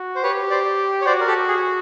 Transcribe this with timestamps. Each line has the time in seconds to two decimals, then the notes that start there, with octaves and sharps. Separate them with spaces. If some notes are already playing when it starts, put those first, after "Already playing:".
Already playing: F#4
0.16 C5
0.23 G4 B4 C#5
0.50 C5 D5
1.01 C#5
1.06 F#4 C5 D5
1.20 A#4
1.27 G4 A4
1.48 G#4